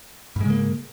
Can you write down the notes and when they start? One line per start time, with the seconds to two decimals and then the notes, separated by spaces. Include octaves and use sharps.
0.36 G#2
0.41 G#3
0.45 C#3
0.50 A#3